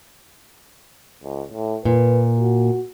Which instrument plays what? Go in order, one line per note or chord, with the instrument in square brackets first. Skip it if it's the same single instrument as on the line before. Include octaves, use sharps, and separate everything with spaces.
[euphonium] C#2
A2
[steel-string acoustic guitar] A#2 [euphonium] B4
[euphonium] F#4